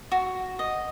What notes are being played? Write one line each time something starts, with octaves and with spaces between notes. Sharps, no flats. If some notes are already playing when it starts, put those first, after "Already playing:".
F#4
D#5